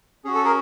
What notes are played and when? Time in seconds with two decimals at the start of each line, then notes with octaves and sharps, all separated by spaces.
0.24 C#4 G#4
0.27 F#4
0.35 A4
0.45 G#4 A#4